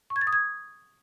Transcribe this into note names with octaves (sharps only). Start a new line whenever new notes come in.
C#6
G#6
A6
D#6
G#6